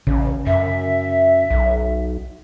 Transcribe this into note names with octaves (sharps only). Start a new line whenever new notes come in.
A1 C#3
F#2 E5
B1